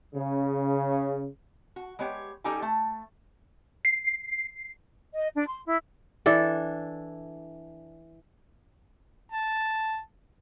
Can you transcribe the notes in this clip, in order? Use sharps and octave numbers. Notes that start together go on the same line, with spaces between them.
C#3
F#4
G#3 B3 G4 C#5
G3 C#4 D#4 G4 A4 G#5
A3 A5
C7
D#5
D4
C6
E4
E3 D4 A4
A5